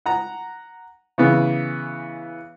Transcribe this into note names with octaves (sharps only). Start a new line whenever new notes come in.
F#5 A#5
C#3 E3 B3